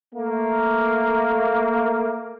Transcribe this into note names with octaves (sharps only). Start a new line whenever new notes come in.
A3 A#3